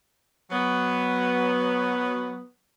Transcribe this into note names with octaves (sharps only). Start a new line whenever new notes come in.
F#3 B3